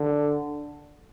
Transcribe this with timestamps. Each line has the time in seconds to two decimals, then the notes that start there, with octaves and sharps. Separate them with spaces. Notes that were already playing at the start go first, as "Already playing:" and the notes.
Already playing: D3